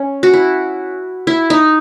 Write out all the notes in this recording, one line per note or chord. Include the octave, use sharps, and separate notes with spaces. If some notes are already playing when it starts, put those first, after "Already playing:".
Already playing: C#4
F#4
E4
E4
D#4